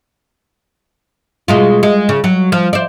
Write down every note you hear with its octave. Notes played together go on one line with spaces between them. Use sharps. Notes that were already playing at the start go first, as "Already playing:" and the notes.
B2 G#3 F4
G#3
C#3
F#3
F3
C5 D5